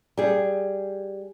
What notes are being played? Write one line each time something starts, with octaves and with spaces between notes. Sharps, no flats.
G3 G#4